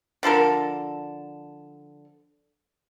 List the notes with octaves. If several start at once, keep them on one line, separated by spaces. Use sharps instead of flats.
D3 F3 A4 A#4